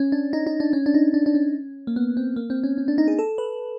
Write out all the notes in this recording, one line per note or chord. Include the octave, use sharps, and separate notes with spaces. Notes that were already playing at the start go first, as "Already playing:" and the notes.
Already playing: C#4
D4
D#4
D#4
D4
C#4
D4
D#4
D4
D4
C#4
A#3
B3
C4
A#3
C4
C#4
C#4
D4
D#4
G#4
A4
B4